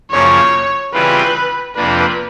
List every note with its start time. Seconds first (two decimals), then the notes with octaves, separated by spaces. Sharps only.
0.11 F#2 C#3 F3 A#3 C#5
0.93 C#3 E3 G3 C4 F4 B4
1.76 F2 C3 F3 A#3 D4 B4